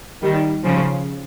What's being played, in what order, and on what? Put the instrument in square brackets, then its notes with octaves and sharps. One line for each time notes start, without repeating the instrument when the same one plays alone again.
[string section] D#3 G3
C#3 F3